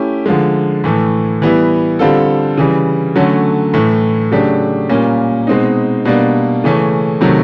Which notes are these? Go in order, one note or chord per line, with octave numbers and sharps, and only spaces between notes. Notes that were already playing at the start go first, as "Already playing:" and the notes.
Already playing: A3 C#4 E4 G4
D3 F3 G#3
A2 E3 A3
E3 G3 B3 E4
D3 G3 C4 F4 A4
C#3 E3 G3
D3 F#3 A3 C#4
A2 E3 A3
C#3 F#3 A3 D4 G4
A#2 G3 A#3 C#4
B2 G#3 C4 D#4
B2 G3 A#3 D4
C#3 E3 A3 C#4
C3 D#3 F#3 A3